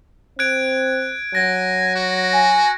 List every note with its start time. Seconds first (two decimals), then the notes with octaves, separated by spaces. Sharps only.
0.39 C4 F#6 G#6 D7
1.35 F#3 G#5 A#6
1.95 F#4
2.33 G#5